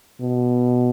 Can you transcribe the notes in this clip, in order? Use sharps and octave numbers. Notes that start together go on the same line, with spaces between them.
B2